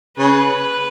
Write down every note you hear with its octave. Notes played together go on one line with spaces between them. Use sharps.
C#3 B4